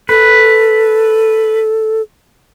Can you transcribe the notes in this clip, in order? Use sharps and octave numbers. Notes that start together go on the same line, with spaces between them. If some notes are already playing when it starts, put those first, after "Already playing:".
A4 B4